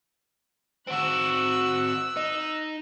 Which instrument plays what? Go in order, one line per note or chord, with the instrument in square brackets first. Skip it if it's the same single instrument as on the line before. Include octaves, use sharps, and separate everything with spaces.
[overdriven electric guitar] C4 F#4 [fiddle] E6 F#6
[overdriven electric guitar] D#4